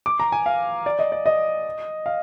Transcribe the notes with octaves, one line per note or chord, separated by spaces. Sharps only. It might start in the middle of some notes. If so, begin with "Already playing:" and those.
D6
A#5
G#5
F5
D5
D#5
D5
D#5
F5